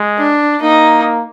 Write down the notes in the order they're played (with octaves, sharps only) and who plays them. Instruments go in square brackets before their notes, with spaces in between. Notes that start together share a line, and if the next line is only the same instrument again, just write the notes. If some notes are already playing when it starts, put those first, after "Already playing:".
Already playing: [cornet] G#3
[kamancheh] D4
[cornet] A#3 [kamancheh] D#4